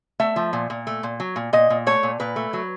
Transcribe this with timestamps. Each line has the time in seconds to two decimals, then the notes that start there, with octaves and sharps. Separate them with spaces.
0.20 A3 E5
0.36 F3
0.53 A#2
0.70 A#2
0.87 A3
1.03 A#2
1.20 F#3
1.36 A#2
1.53 A#2 D#5
1.70 A#2
1.87 A3 C#5
2.03 A#2
2.20 A#2 B4
2.36 A3
2.53 F#3